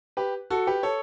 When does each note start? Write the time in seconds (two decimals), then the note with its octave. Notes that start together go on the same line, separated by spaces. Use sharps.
0.17 G4 B4
0.50 F#4 A4
0.67 G4 B4
0.83 A4 C#5